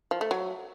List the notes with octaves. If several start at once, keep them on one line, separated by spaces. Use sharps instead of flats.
F3
A3
F#3